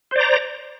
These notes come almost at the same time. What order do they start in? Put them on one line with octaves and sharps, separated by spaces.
C5 D5 A#5